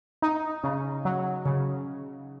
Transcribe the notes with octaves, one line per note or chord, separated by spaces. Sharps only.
D#4
C#3
F#3
C#3